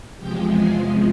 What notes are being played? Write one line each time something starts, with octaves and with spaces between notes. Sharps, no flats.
E2 C3 F3 G#3 G4 G5
G#4 G#5